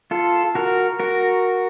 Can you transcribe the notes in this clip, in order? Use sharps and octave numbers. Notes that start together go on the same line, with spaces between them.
F4 A4
F#4 A#4
F#4 A#4